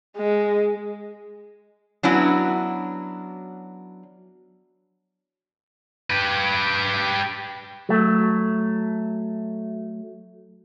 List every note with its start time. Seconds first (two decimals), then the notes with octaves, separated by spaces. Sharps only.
0.17 G#3
2.03 F#3 B3 C#4 D4 E4 F#4
6.10 G4 B4
7.89 F#3 A3